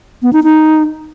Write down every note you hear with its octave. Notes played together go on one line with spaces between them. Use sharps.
B3
D#4
D#4